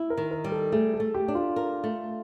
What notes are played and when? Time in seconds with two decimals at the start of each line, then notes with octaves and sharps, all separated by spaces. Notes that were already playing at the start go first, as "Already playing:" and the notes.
Already playing: E4
0.10 A#4
0.17 D#3
0.31 A#4
0.44 G3
0.52 A4
0.72 A3 G#4
0.94 A4
1.00 A3
1.14 G4
1.28 D4
1.35 F4
1.56 A#4
1.84 A3